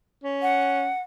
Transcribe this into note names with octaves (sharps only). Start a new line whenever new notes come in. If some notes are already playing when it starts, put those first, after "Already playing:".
C#4
F#5